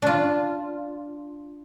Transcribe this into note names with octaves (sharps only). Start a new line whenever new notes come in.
D4 F4